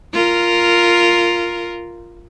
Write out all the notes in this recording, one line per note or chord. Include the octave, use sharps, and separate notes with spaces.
F4 A#4